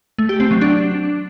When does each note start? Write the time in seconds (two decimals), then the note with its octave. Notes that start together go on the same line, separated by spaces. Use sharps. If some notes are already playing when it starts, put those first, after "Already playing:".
0.18 A3
0.29 G4
0.40 C4
0.51 F#3
0.61 D4